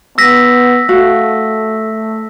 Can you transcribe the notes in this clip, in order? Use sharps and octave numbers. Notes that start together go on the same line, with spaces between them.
B3 E6 A#6 B6
A3 F#4 F5